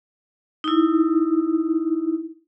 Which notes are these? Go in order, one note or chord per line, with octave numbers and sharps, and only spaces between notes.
D#4 E4